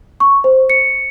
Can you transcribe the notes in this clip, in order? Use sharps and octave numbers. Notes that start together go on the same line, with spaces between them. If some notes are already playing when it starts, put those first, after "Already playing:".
C#6
C5
C#7